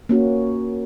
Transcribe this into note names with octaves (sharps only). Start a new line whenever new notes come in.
A#3 C#4 F#4